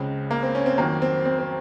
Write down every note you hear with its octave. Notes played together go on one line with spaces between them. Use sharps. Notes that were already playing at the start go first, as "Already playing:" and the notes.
Already playing: C#2 C#3 G#3 C4
A#3
C4
C#4
C4
F2 D#3 F#3 A#3
C4
C4
C4